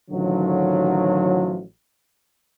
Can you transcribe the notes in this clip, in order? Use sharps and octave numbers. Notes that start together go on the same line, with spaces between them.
A1 D3 D#3 F3 F#3